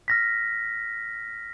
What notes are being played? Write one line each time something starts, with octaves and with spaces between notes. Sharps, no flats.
F6 A#6 B6